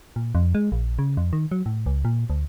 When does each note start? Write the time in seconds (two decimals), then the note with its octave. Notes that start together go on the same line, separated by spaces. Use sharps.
0.16 A#2
0.35 F2
0.55 G#3
0.72 A#1
0.99 C#3
1.17 F2
1.33 D#3
1.52 F#3
1.66 A2
1.86 C#2
2.05 A#2
2.30 D2